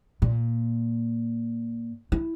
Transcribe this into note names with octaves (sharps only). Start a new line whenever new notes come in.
A#2
E4